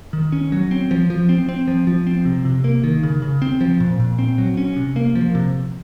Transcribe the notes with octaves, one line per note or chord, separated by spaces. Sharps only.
D#3
C#4
F#3
C4
F3
F3
C4
C4
F3
F3
C4
C3
C3
A#3
D#3
C#3
C#3
C4
F3
A#2
A#2
C4
F#3
C#4
C3
A#3
F3
C3